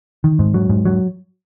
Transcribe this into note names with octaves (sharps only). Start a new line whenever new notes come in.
D#3
G#2
F#3
G#2
F#3